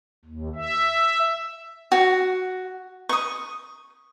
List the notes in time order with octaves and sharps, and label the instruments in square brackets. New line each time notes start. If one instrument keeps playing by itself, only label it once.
[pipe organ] D#2
E5
[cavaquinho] F#4
C#6 D#6